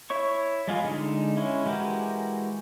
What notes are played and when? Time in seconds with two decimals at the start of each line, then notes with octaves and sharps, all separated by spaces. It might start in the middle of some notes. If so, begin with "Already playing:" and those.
0.10 E4 C#5 C#6
0.68 G3 G#3 F4 G#4
0.84 D3 G#3 D#4
1.37 G#3 C#4 E4
1.66 E3 G#3 F#4 G4 A#4